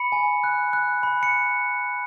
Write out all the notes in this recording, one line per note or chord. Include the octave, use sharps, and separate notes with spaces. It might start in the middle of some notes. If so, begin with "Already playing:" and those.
Already playing: B5 C#7
G#5
F#6
F#6
B5
C#7